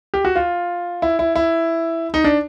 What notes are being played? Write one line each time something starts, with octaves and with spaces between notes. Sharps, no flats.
G4
F#4
F4
E4
E4
E4
D#4
D4